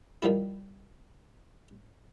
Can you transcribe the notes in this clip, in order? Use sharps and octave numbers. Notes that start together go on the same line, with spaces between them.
D#3 F3 G3 E4